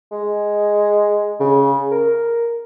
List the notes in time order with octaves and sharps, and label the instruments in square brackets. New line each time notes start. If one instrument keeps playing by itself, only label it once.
[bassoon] G#3
C#3
A#4